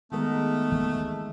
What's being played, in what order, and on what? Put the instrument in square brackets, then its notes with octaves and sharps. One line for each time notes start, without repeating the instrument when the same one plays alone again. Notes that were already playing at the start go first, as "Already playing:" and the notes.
[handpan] D#3 G#3 A#4 [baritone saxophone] A3 [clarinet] B3
[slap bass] E3 A#3 [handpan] G#3